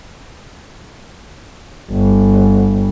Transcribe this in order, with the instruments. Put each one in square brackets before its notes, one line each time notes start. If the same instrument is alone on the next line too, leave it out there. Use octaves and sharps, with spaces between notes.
[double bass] G1